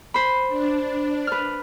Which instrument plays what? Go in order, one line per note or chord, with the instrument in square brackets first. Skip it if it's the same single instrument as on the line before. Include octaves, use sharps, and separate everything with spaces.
[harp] C5 B5
[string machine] D4
[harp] B4 F6